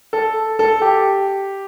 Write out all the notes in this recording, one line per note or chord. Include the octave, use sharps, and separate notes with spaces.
A4
A4
G4